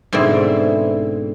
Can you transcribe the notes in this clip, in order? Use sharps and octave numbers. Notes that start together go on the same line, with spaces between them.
G#2 B2 D3 C4 E4